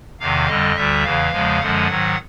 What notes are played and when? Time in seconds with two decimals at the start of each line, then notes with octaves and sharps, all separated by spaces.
0.20 E2 C3 D#3 F5
0.47 F2 D3 G3 D#5
0.76 D2 D3 G3 E5
1.04 E2 C#3 E3 F5
1.32 E2 C#3 F3 G#3
1.60 F#2 D3 F3 G#3 F#5
1.88 G#2 D#3 F#3